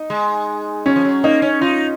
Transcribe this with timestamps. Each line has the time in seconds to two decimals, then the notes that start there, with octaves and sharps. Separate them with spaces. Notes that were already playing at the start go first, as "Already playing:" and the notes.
Already playing: D#4
0.10 G#3
0.86 F#3 C#4
0.96 F3
1.04 F#3
1.24 A#3 D#4
1.42 C#4
1.61 D#4 F4